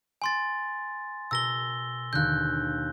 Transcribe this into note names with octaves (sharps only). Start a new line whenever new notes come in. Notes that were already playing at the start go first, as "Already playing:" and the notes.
G#5 C6 A6
B2 A#4 E6 A#6 G7
D#2 D3 F#6 G6